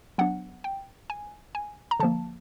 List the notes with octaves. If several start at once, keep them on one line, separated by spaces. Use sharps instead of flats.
F#3 B3 D4 F#5
G5
G#5
G#5
A#5
D3 F3 A#3 A5